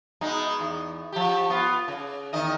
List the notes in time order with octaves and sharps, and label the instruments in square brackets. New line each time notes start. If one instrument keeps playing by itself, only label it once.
[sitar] B2 G#3 D#4
E2
F3 G4
B3 F4
C#3
E2 D#3 D#5